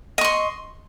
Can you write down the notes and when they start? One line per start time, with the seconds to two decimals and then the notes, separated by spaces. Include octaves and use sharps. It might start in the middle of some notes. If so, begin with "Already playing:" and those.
0.18 D#5
0.21 C#6
0.25 C6